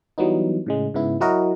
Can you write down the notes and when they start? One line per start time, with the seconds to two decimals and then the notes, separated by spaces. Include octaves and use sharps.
0.18 E3 F#3 G3 B3 D#4
0.67 A2 C#3 G#3
0.94 G#2 C#3 B3 E4
1.21 F#3 E4 F#4 A#4 D#5